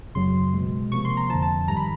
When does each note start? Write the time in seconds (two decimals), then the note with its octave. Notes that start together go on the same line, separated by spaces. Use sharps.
0.15 F#2 C#3 F#3 C6
0.54 B2 G#3
0.91 C3 F3 A#3 C#6
1.05 C6
1.17 A#5
1.29 F2 D3 F3 A5
1.42 A5
1.68 G#2 D#3 G3 A#5
1.77 B5